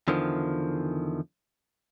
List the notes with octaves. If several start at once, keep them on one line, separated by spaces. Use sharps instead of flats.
E2 D3 D#3 F3